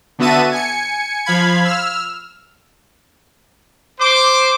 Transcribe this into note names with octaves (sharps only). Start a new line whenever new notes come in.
D3 B3 F#4 E5 A5 D#7
G#5 C#7
F3 F5 B5 G#6
E6 F6
C5 D6